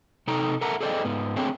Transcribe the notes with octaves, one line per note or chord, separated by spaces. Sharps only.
C3 D#4 A4 G5 A#5
A4 A#4 E5 F#5 A5 A#5
G#4 A4 C5 D5 D#5 G5
G#2 B3
A3 C4 D4 G#4 C#5 G5